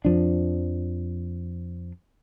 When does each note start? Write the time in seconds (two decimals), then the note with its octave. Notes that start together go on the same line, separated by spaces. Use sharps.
0.05 F2 F3 D4